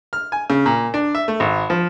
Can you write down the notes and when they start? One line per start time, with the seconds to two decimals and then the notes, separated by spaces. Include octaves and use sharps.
0.13 F6
0.32 G#5
0.50 C#3
0.66 A#2
0.94 D4
1.15 E5
1.28 A3
1.40 G#1
1.70 F3